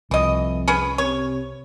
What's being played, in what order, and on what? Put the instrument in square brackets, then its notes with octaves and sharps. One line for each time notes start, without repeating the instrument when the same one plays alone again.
[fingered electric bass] C2 [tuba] F2 [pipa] E3 D#5
[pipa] C#4 G#4 B4
[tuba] C3 [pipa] C#5